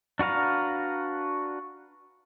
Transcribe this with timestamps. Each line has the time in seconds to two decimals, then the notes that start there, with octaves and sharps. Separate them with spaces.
0.19 D4 F#4 B4 F5 A#5